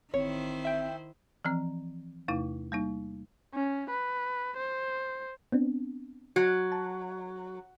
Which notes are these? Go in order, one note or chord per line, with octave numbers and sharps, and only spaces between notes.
A1 D#3 C4 E4 C5 C#5
E5 G5
E3 F3 C4
E2 C3 A3 D#4 E4
G3 A#3 D#4
C#4
B4
C5
B3 C4 D4
F#3 F#4
A5